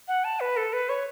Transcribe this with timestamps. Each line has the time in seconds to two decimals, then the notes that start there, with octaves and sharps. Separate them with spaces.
0.08 F#5
0.24 A5
0.40 B4
0.57 A4
0.73 B4
0.89 C#5